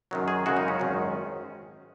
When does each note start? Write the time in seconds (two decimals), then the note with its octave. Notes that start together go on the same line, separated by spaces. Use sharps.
0.11 F#2 D#3 F#3
0.28 G#4
0.46 F#2 C#3 G#3 F#4
0.57 D#4
0.68 C#4
0.80 G#1 F#2 D#3